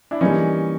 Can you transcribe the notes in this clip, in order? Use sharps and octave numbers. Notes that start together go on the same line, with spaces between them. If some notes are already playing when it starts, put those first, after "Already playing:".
D4 E4
E3 G3 A#3 C#4 D#4